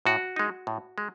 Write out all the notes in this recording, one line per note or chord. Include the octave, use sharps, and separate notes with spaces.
A2 F#4
G#3 D#4
A2
G#3